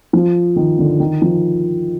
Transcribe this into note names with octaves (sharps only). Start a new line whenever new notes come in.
F3
D#3
D3
D#3
F3